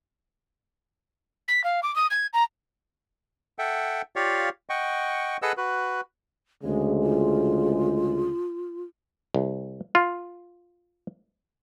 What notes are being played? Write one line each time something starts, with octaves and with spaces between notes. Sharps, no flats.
B6
F5
D6
D#6
G#6
A#5
A4 E5 F#5 G5
F4 G4 C#5 D5 F5
D#5 F#5 G5 C#6
G#4 A4 B4 D#5 F#5 E6
F#4 B4
D2 C#3 G#3 G#4
F4
C2
F4